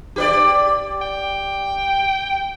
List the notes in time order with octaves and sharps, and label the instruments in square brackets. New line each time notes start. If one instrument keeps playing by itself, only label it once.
[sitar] G4 B4 D5
[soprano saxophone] G5